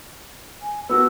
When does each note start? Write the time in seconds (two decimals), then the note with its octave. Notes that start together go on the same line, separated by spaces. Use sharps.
0.62 G#5
0.89 B3 F#4 A#4 E6